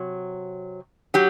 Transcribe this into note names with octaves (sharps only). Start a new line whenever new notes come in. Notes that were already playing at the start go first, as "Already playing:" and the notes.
Already playing: C3 F#3
F#3 G4